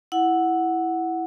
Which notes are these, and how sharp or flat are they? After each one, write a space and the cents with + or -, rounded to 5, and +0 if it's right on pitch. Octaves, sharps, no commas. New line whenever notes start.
E4 +0 F#5 +0